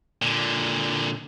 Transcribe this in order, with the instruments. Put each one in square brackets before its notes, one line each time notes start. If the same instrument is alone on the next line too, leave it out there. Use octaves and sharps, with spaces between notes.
[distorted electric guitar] A#2 D3